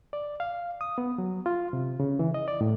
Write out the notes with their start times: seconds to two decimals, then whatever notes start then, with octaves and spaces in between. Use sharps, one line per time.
0.13 D5
0.40 F5
0.81 D#6
0.98 B3
1.18 F#3
1.46 F4
1.73 C3
2.00 C#3
2.19 E3
2.34 D#5
2.48 D5
2.61 A2